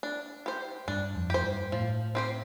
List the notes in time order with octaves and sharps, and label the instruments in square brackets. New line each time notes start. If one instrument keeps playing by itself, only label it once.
[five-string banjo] D4
G4 C5
[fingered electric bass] G2 [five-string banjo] D4
[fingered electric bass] F2
[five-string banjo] G4 C5
[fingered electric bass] G2
[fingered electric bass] A2 [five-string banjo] F3
[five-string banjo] C4 G4 C5